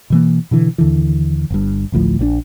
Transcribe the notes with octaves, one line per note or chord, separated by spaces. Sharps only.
B2 E3 A#3
B2 D3 E3
D#2 D3 E3
G1 G2
A1 D2 A2 F3
A#1 D3 D4